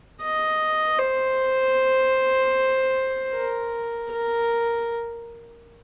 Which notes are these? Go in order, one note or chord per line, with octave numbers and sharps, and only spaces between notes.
D#5
C5
A#4
A#4